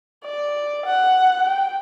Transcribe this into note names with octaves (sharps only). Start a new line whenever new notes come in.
D5
F#5
G5